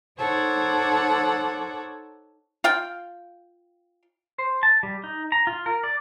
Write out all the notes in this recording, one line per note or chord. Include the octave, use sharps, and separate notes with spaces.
D#4 A4 C5 C#5 F#5 D6
F4 F5 G5
C5
A5
G3
D#4
A#5
F4
A#4
D5